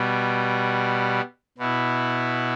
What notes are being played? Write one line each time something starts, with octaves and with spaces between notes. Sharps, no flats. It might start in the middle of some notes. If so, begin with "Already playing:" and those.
Already playing: B2 G3 B3
B2 B3 E4